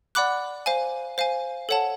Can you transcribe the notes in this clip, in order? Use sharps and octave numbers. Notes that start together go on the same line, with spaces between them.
D5 F#5 B5 D6 F#6
C5 F5 G#5
C5 F5 G#5
A4 C#5 F#5 A5